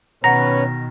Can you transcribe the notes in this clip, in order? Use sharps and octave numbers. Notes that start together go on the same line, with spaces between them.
B2 D#3 C#4 B4 C#5 F#5 A#5 A#6